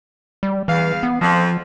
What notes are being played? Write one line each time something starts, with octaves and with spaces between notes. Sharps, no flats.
G3
E2 E3 F5
B3
F2 F3